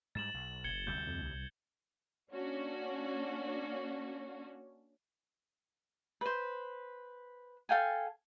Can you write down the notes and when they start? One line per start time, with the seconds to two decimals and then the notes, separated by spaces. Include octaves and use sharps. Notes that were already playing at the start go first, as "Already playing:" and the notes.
0.15 G#2 G3 A6 E7 F#7
0.34 B1
0.64 F#1 G#6 C#7 G7
0.87 D2 C3 G3 G6
1.07 F2
1.22 C2
2.32 A#3 C#4 D4 F#4
6.21 B4 C5
7.69 A4 F5 G5 G#5